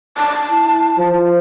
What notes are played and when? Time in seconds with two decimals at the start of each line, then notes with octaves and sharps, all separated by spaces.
0.17 A5
0.51 E4
0.98 F3